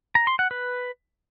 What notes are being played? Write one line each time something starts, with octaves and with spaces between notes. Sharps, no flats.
A#5
C6
F#5
B4